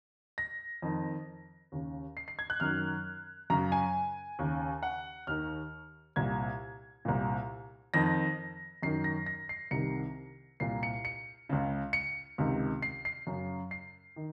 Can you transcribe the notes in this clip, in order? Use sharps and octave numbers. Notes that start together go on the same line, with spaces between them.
A#6
F2 D#3
D#2 C#3
C7
C7
G#6
F#6
F#2 D#3 F6
F#2 C#3 A#5
G#5
D#2 C#3
F#5
D#2 D#3 F6
C2 A#2 G#6
C2 A#2
F2 D#3 A#6
F#2 D#3 C7
A#6
A#6
C7
C2 C3 D#3 C#7
C2 A#2 C7
C#7
C#7
C#2 C#3
C#7
C#2 C3 D#3
C7
C7
F#2 C#3
C7
D#3